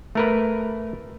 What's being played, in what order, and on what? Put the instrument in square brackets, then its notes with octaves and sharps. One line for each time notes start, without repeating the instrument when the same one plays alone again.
[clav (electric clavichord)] A3 A#4 B4